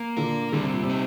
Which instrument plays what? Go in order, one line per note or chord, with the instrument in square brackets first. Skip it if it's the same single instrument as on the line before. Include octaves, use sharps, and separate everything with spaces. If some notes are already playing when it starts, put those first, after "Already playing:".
Already playing: [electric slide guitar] A#3
[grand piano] A#2 D3 [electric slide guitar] A#4
[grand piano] D3 [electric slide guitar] G3
[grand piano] C3
A#2
C3
[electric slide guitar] D#4